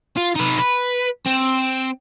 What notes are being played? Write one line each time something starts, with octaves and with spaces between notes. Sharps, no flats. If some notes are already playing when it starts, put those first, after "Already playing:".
F4
D#4 B4
B4
C4